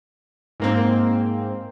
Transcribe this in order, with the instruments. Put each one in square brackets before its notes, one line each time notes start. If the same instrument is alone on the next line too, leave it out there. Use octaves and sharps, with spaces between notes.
[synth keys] G#2 A#3 C4